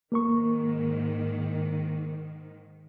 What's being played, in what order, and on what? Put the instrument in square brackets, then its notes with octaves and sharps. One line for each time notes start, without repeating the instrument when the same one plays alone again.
[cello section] G#2 D#3 [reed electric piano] A#3 A#4 C#6